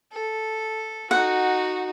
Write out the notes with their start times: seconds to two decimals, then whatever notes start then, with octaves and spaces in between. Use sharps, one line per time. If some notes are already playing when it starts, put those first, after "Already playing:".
0.13 A4
1.11 D#4 F#4 F#5